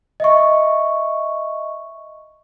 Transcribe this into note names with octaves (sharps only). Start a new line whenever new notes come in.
D#5 E5 C#6